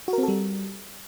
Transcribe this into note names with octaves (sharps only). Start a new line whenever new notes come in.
F#4
A#4
C4
A4
G3